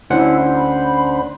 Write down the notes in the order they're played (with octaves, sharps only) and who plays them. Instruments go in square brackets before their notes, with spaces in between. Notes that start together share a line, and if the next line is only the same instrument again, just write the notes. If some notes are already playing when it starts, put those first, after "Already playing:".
[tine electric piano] D2 C#4 F#5 [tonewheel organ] D4 C5 [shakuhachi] E4
[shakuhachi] B5